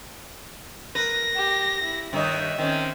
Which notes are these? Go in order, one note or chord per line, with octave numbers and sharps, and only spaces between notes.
A#4 B4 A#6
G4
E4
G2 D#3 D#4 C#5 E5
D#3 C4 C#4